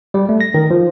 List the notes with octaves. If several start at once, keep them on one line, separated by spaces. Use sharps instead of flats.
G3
A3
A#6
D#3
F3